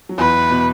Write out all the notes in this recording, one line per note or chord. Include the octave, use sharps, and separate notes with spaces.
F#3
E2 E3 B4
B2 B3